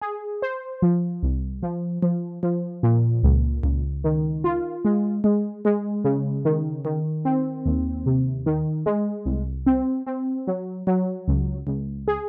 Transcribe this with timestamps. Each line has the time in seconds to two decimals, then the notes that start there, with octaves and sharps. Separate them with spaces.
0.01 G#4
0.42 C5
0.82 F3
1.22 C2
1.63 F3
2.03 F3
2.43 F3
2.83 A#2
3.23 C#2
3.63 C#2
4.04 D#3
4.44 F4
4.85 G#3
5.24 G#3
5.65 G#3
6.04 C#3
6.45 D#3
6.85 D#3
7.25 C4
7.65 D#2
8.06 C3
8.46 D#3
8.86 G#3
9.25 C2
9.66 C4
10.07 C4
10.47 F#3
10.87 F#3
11.28 C#2
11.67 C#2
12.08 G#4